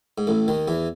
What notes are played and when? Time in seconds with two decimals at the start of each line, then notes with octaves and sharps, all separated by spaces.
0.18 G#2
0.27 A1 A2
0.48 D#2 D#3
0.68 E2 E3